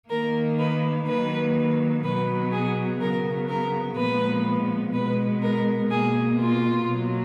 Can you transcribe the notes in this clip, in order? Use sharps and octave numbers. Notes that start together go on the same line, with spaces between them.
D#3 A#3 A#4
B4
D#3 F#3 A#3 B4
B2 F#3 B3 B4
G#4
C#3 F#3 B3 A#4
A#4
A#2 F3 G#3 B3 B4
B2 G#3 B3 B4
A#4
B2 A#3 G#4
F4
B2 F#3 A#3